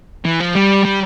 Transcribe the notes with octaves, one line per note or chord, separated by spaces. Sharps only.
E3
F3
G3
G3